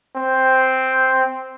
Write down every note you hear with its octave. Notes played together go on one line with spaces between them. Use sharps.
C4